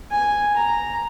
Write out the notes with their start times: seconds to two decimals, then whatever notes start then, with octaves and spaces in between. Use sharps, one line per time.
0.11 G#5
0.56 A#5